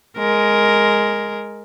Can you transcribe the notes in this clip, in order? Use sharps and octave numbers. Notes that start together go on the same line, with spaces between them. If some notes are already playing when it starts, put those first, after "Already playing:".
G#3 A#4